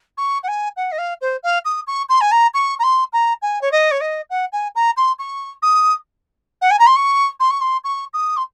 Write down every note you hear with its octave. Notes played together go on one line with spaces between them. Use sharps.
C#6
F#5
G#5
F#5
D#5
F5
C5
F5
D#6
C#6
C6
G#5
A#5
C#6
A#5
C6
A#5
G#5
C#5
D#5
C#5
D#5
F#5
G#5
A#5
C6
C#6
D#6
F#5
G#5
A#5
C6
C#6
C6
C#6
C6
C#6
D#6
C6